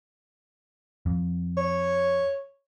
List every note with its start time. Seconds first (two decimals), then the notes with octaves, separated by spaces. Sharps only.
1.06 F2
1.57 C#5